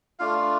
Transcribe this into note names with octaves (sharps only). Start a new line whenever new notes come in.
A3 D4 F4 F5